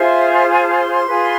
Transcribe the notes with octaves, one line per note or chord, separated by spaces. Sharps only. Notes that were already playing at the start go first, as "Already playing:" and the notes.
Already playing: F4 G#4 C5 E5
G#5
A5
C6
C6
F4 G#4 B4